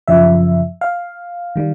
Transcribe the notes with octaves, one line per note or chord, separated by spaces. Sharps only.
F#2 C#3 F3 E5
F5
D#3 G3